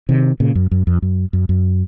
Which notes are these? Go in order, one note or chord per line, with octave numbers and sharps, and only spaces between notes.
C3 D#3
A#2 C#3
F#2
F#2
F2
F#2
F#2
F#2